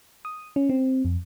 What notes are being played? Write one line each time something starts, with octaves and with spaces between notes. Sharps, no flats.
D#6
C#4
C4
F2